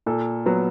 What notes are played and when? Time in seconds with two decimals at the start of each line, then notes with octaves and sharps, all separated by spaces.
0.06 A#2 A4
0.46 F#3 B3